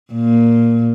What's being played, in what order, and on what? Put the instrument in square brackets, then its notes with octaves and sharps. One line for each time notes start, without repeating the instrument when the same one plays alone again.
[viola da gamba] A#2